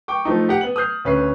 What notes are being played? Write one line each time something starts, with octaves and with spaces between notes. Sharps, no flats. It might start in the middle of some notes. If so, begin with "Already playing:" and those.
G5 C#6 D6
F3 A3 D#4
G4 F#5
B3 F#7
D#6 F6 G6 C7
D2 C#4 B4 E5 C7